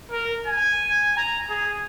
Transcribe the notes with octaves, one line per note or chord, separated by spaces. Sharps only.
A#4
G#5
A#5
G#4